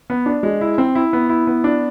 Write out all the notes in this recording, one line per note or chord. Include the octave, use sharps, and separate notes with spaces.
B3
D4
G#3
E4
C4
E4
B3
E4
B3
D4